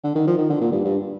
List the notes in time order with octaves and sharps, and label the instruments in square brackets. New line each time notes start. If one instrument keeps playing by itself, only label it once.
[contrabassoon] D3
D#3
F3
D#3
D3
A#2
G2
G2